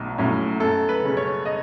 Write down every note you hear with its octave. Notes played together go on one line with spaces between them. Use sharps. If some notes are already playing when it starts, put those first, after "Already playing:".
Already playing: B1 A2 F#3
A2 F#3 C#4
F#2 A4
B4
C#3 G#3 C#4
C#5
D#5